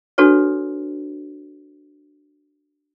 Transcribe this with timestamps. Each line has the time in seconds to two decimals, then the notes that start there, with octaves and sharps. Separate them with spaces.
0.18 D4 F#4 A4 B4 C#5